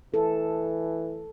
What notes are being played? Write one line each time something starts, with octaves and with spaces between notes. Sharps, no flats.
E3 A4